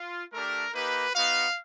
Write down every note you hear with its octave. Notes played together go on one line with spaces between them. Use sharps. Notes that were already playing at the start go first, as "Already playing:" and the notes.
Already playing: F4
A3 D4 G4 A#4
A#3 D#4 G4 B4
B3 D#4 F#4 F5